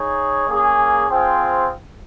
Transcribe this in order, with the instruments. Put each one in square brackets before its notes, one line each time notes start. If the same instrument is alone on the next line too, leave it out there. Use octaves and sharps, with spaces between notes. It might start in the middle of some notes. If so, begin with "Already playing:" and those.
Already playing: [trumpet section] D#4 G#4 C#5
A#3 C#4 G#4
C4 F4 G#4 C5 G5